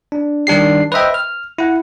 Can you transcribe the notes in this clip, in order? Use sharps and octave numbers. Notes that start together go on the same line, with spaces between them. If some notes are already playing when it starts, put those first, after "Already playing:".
D4
D#3 G3 D4 G4 C7
B4 C5 D#5 E5 G5
F6
E4 F#5